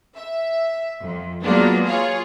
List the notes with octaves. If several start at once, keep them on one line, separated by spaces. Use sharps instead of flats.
E5
F2
F#3 G#3 A#3 B3 D4 F4
F4 G#4 C#5